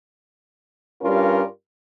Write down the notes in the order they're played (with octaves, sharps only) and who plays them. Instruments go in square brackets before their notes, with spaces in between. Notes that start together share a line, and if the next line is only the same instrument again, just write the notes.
[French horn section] G2 G3 C#4 F4 A#4